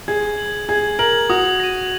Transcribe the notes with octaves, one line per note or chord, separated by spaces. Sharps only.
G#4 G#6
F#7
G#4 G#6
A#4 F#7
F#4 D#6
A#6 D#7